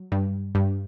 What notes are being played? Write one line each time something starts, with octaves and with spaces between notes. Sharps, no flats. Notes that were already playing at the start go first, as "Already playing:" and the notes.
Already playing: F#3
G2
G2